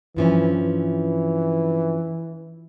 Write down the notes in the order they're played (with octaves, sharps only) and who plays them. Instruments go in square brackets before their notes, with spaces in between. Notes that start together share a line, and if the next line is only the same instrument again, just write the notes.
[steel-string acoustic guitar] G2 F3 C#4 [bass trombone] E3
[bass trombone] E3